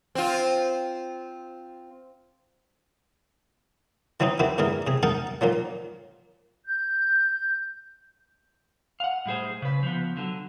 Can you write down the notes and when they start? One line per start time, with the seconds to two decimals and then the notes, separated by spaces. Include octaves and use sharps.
0.15 C4 F4
4.20 E3 F#3 C4 C#4 D#4
4.39 D#3 C4 E4 F#4 G4
4.58 G2 D3 E3 G#4 A#4
4.87 C3 G#4
5.03 D#4 A#4 F#5 G5 A5
5.41 A#2 D#3 F3 F#3
6.66 G6
9.00 F5 F#5
9.26 A2 G3 G#4 C5
9.62 C#3 B4
9.83 F3 B3
10.17 D3 F#3